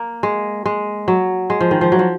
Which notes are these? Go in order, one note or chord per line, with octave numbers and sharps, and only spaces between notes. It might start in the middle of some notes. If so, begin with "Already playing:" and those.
Already playing: A#3
G#3
G#3
F#3
G#3
F3
D#3
F3
F#3
F3